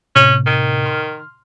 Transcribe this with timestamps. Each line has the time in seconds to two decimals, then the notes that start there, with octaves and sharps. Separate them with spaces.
0.16 A2 C3 C#4
0.46 D#3
0.85 C6 F6